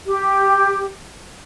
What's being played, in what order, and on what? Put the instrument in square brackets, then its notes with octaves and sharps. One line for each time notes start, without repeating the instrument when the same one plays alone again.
[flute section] G4